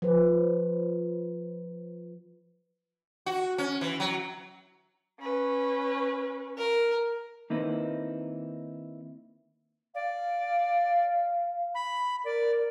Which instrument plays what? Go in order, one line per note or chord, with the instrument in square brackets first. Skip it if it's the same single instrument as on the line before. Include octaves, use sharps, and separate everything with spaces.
[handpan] F3 B4
[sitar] F#4
C#4
E3
F#3
[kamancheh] C#4 B4
[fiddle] A#4
[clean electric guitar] D#3 A#3 C4 D#4 E4 B4
[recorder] D5 [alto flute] F5
[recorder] B5
[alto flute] A#4 [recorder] D5